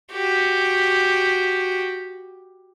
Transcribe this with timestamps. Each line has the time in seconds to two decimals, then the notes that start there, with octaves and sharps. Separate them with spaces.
0.12 F#4 G4